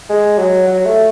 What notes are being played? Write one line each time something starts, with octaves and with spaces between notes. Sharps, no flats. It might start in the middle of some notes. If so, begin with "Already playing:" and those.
G#3
F#3
F#3
A3